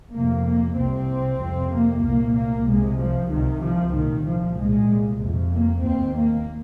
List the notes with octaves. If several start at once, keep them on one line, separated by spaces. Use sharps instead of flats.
F2 C3 A#3
A#3
C2 C3 C4
F2 C3
A#3
C2 A#2 A#3
A#3
C2 C3 G#3
F3
C2 C3 D#3
F3
C2 A#2 D#3
F3
C2 A#2 G#3
F2 C3
A#3
D#2 C4
A#3